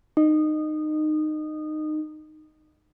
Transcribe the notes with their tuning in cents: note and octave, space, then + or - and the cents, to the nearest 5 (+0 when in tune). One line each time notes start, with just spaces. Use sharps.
D#4 -20